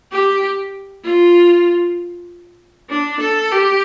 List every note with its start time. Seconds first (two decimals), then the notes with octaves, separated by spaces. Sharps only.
0.12 G4
1.04 F4
2.90 D4
3.20 A4
3.51 G4